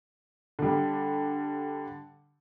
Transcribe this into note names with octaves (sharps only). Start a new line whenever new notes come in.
D3 G3